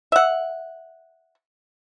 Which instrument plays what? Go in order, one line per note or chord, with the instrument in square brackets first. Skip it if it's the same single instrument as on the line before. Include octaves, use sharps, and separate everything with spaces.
[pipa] E5 F#5